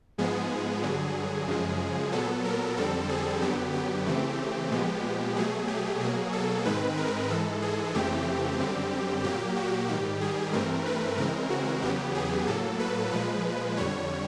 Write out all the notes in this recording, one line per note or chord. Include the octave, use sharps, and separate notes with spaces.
G#2 F3 G#3 B3 G#4
G2 D3 F#3
F#2 C#3 F3 G#3
A#2 F#3 B3 A4
A#4
F2 D3 G3 C4 A4
G#4
F#2 D3 F#3 B3 G4
G4
C#3 E3 A3 C4
A#2 F3 G#3 B3
B2 F#3 A3 G#4
G4
B2 F#3 A#3 G#4
A4
G#2 D#3 G#3 C4 B4
A#4
G#2 E3 G#3 A4
G#4
F2 C#3 E3 A3 C4 G4
F#2 D3 G3 C4
A#2 F#3 A#3 G4
F#4
G#2 D#3 G3 G4
G#4
G2 E3 A3 C4 A#4
B4
C#3 E3 G#3 C4 A#4
F#4
E2 C#3 F#3 B3 G4
G#4
A2 F#3 A#3 A4
B4
A#2 F3 G#3 B4
F2 D3 G3 C#5